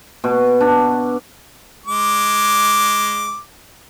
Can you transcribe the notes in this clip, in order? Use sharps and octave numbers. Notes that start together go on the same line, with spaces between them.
B2
D4
G#3 D6